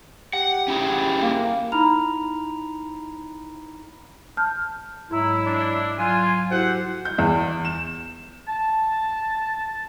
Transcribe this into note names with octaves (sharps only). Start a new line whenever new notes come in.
G4 F#5
C#4 E4 G#4
A#3
D#4 E4 A#5 B5 F6 F7
A5 F6 G6
G#2 F#3 G#3 E4 A#5
D4
F#3 F4 G#5 F#6
E4 F#4 G4 A4 C5 F#5
G6
E2
E7
A5